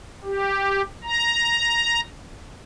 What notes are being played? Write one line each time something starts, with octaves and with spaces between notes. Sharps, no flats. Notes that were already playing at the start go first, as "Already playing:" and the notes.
G4
A#5